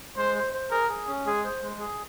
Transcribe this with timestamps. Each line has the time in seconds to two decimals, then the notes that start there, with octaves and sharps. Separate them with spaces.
0.17 G#3 C5
0.35 C5
0.53 C5
0.71 G#4 A#4
0.89 G#4
1.07 C#4
1.25 G#3 G#4
1.44 C5
1.63 G#3
1.80 G#4